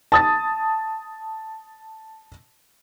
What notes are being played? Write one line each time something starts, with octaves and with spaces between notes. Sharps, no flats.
A5 D#6 A6